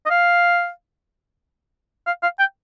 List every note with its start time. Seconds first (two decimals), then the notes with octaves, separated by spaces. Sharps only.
0.06 D#5
0.10 F5
2.06 F5
2.23 F5
2.39 G5